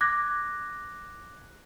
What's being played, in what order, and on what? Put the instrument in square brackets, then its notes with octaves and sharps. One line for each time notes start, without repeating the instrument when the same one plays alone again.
[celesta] D6 F#6 G#6 A#6